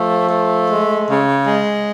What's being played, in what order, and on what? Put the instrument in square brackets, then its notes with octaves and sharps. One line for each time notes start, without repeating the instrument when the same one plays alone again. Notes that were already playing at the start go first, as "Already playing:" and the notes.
Already playing: [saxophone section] F3 A3
A3
G#3
C#3
G#3